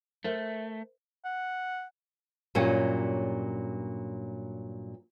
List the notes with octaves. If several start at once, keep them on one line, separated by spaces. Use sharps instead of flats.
A3 A#4 C5 E5
F#5
G2 A#2 F#3 G3 C#4